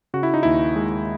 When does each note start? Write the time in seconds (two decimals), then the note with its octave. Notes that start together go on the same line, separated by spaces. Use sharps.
0.14 C#3 F#4
0.23 E4
0.34 D#4
0.43 D#2 E4
0.76 G#3